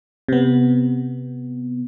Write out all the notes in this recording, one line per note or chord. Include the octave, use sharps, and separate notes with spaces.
C3 B3